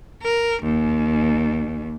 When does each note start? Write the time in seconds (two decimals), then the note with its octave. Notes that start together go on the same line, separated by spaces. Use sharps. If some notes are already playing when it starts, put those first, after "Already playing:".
0.22 A#4
0.63 D#2